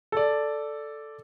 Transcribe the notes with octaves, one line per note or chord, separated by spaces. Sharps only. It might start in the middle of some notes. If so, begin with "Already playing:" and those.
A4 D5